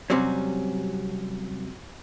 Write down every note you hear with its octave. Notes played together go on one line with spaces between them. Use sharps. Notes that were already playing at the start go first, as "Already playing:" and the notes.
C3 F#3 G3 C4 C#4